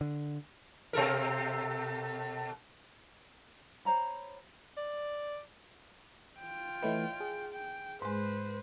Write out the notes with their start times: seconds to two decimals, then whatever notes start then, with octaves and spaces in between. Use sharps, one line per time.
0.01 D3
0.93 B2 A4 A#4
3.85 C5 C#5 A#5 B5
4.77 D5
6.40 F4 G5
6.83 E3 A3 B4 C#5 D#5 E5
7.20 G#4
7.53 G5
8.02 G#2 G#3 B4 C5